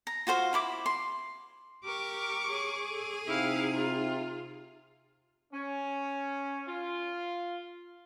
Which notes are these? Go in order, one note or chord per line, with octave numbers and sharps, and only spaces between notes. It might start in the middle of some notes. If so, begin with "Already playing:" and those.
A#5
F4 F#4 C5 F5
E4 B5 D6
C6
G4 A#4 C#6 D6
G#4 C#5
A4
C3 D#4 E4 F5
F4
C#4
F4